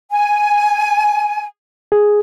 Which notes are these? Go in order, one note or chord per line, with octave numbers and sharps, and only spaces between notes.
G#5
G#4